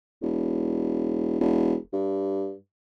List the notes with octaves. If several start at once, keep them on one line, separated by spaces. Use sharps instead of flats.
E1
E1
G2